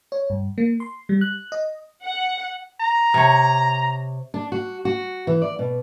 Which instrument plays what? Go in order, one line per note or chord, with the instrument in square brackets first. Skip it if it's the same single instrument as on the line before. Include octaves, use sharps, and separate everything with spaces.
[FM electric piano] C#5
G2
A#3
C6
G3
F#6
D#5
[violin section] F#5
[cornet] A#5
[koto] C3 C#5
[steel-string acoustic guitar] D4
F#4
F#4
E3
D5
B2